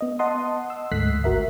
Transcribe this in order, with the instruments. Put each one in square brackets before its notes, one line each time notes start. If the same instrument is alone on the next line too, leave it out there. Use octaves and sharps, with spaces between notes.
[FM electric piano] B3 D#5
D#5 F#5 A5 C6 D#6
E6
D2 G#2 A3 F#6 B6 C7
G#1 F#4 A#4 E5